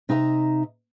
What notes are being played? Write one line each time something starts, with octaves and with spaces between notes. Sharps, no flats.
C3 D#4 D#5 E5 A#5